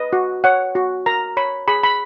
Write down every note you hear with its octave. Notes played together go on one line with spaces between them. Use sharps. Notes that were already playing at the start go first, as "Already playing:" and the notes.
Already playing: B4 D#5
F#4
C#5 F#5
F#4
A#4 A#5
C#5 B5
G#4 B5
B5